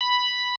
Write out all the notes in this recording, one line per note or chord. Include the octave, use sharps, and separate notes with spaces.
B5